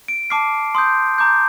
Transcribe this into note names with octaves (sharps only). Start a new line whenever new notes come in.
D7
A5 D6 F6 C7
C6 D#6 G6
A#5 D6 G6